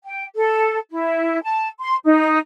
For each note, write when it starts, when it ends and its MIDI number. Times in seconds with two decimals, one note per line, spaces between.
0.03 0.25 79
0.36 0.77 69
0.91 1.41 64
1.43 1.67 81
1.80 1.96 84
2.05 2.37 63